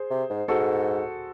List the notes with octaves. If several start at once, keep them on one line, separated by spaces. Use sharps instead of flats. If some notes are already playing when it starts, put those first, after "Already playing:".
Already playing: G#4 C5
C3
G#2
G#2 F#4 A4